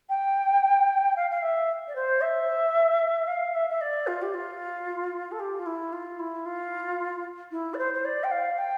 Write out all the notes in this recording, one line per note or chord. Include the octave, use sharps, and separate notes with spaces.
G5
F5
F5
E5
D5
C5
E5
F5
E5
E5
D5
F4
G4
F4
A4
G4
F4
E4
F4
E4
F4
E4
D5
C5
C5
D5
G5
F5
G5